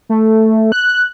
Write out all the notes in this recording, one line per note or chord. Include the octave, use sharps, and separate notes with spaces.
A3
F#6